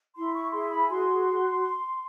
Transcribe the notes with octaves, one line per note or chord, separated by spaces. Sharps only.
E4 C6
C#6
G#4 C6
B5
F#4 C6